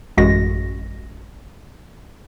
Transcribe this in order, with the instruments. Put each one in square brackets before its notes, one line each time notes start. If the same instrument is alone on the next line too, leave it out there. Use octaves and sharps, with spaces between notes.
[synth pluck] A1 F#2 G#3 F#4 A#6